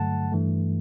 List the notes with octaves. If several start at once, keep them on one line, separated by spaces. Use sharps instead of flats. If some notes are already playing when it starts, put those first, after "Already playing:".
Already playing: G2 D3 F#3 A3 F#5 A5
G2 E3 A3